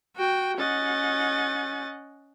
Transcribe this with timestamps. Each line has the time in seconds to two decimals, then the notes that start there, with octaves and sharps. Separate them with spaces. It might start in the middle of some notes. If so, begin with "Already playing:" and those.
0.17 F#4 G5
0.58 C#4 D#5 F#5 A6